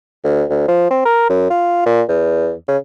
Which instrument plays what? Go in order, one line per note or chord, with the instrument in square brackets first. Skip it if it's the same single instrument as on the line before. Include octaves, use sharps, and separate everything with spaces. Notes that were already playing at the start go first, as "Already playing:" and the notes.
[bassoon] D2
D2
F3
C4
A#4
F#2
F4
A#2
E2
C#3